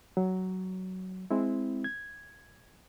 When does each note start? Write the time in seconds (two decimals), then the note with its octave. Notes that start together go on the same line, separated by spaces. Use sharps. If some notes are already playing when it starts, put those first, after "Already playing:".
0.17 F#3
1.31 G#3 C4 E4
1.84 G#6